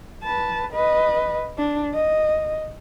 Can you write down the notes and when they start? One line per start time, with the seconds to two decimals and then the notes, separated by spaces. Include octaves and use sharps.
0.23 B4 A5
0.72 B4 D#5
1.58 D4
1.94 D#5